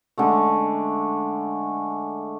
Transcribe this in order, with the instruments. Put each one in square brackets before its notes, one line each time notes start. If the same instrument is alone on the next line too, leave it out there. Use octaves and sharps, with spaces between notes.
[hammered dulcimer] D3 G#3 A3